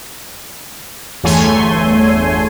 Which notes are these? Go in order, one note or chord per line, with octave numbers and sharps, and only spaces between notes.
G1 E2 A3 C#5 G#5 C6